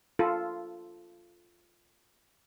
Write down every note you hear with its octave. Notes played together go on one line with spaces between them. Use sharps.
F4 A4